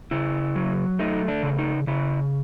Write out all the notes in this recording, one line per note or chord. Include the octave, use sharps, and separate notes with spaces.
C#3 E4
F#3
A3 D#4
D4
C#3
D#4
C#3 E4